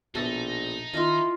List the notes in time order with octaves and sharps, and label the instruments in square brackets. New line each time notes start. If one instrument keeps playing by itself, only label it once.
[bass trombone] A#1 [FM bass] B2 [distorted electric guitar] D#4 [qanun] A4 E5
[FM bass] D#3 [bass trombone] E4 [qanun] F4 A#4 D#5